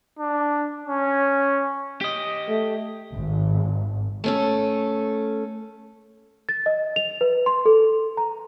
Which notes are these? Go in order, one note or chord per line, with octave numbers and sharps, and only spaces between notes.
D4
C#4
G4 D#5
A3
G#1
A3 C#4 A4
A6
D#5
F7
B4
C6
A4
A#5